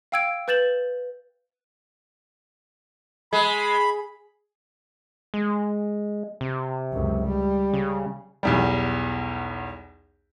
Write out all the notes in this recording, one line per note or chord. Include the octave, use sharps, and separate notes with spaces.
F5 G5 E6 G#6 D7
B4 G6 A6 E7 F#7
G#3 B5
G#3
C3
C#2 F#2
G3
C#3
B1 E2 G3